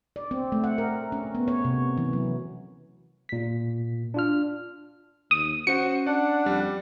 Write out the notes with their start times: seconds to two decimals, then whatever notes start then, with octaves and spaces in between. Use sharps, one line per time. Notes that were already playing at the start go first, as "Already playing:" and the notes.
0.16 D5
0.31 C4
0.52 A3
0.64 F#5
0.78 A#4
1.12 C#4
1.35 B3
1.48 C#5
1.65 C3
1.98 E3
2.13 F#3
3.29 A#2 B6
4.14 D4 F4 F6
5.31 D#2 D#6
5.67 C#4 F#4 C5 F#5 C#7
6.06 D4 D5 F#5
6.46 F2 G3